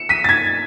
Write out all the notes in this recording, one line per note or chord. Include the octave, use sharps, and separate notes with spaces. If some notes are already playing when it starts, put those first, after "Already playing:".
Already playing: C#7 E7
B6 D#7
A6
G#6 B6